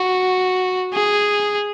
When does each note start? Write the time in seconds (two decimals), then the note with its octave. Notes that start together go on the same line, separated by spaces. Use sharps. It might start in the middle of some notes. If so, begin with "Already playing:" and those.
Already playing: F#4
0.93 G#4